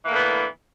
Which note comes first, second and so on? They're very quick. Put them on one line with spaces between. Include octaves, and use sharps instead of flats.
E3 A#3 A2 D3 B3